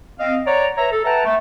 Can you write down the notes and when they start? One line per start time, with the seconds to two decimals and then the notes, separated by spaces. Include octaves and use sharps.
0.20 C4 D#5 F5
0.47 C#5 D5 F#5 A#5
0.77 B4 C#5 E5 A#5
0.92 A4
1.05 B4 E5 F#5 G5 A5 A#5
1.25 A3